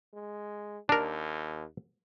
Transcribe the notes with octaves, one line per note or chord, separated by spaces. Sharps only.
G#3
D#2 D4 A#4